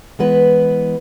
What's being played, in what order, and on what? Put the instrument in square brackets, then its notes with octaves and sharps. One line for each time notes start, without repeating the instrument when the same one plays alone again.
[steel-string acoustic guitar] E3 G#3 B3 B4